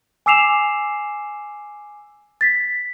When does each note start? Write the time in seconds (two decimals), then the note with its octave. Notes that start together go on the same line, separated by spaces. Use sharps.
0.26 G#5 D6 E6 C7 E7 F7
2.41 A6 B6